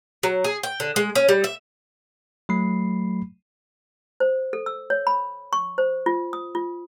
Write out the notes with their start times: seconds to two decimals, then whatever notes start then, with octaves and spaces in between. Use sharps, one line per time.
0.23 F#3
0.44 G#4
0.63 G5
0.80 D3
0.96 G#3
1.15 C#4
1.29 G3
1.44 E5
2.49 F#3 A3 B5 C7
4.20 C5
4.53 A4
4.66 E6
4.90 C#5
5.07 B5
5.53 C#6
5.78 C5
6.06 F4
6.33 D#6
6.55 F4